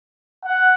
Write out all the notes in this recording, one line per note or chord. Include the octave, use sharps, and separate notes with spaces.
F#5